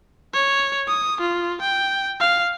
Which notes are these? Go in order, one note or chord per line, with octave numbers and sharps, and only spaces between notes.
C#5
D#6
F4
G5
F5